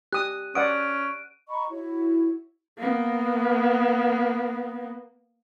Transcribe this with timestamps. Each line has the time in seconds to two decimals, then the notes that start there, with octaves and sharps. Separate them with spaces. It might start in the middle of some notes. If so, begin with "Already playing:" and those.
0.13 G4 D#6 F#6 D#7
0.55 C#4 D5 F#5 D#6 D7
1.49 D#5 A#5 B5 C#6
1.70 E4 F#4 C#5
2.78 A#3 B3